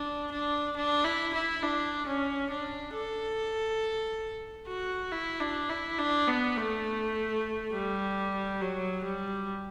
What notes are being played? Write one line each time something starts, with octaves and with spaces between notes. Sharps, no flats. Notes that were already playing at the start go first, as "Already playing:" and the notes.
Already playing: D4
D4
D4
E4
E4
D4
C#4
D4
A4
F#4
E4
D4
E4
D4
B3
A3
G3
F#3
G3